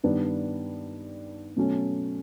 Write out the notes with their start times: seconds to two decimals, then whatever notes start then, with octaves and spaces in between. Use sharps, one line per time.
0.04 G2 D#3 G3 B3 D4
1.57 B2 F#3 A3 C#4